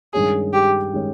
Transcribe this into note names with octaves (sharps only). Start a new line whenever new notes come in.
G2 D#3 G#3 C#4 G#4
G4
D#3 G#3 C#4